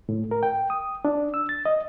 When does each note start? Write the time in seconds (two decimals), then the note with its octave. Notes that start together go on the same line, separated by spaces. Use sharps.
0.09 A2
0.31 A#4
0.43 G5
0.70 D#6
1.05 D4
1.34 E6
1.49 A6
1.66 D#5